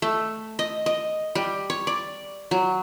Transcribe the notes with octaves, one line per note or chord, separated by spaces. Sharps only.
A3
D#5
D#5
G3
C#5
D5
F#3